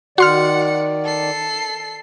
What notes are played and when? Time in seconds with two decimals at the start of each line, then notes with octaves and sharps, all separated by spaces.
0.18 D#3 F#4 D5 F#5 C6 F6 C#7
1.04 A4 C7